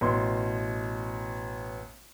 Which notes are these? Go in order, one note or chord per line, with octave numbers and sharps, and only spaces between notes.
A1 B2 C6